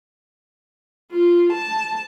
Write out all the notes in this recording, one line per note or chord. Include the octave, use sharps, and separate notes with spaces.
F4
A5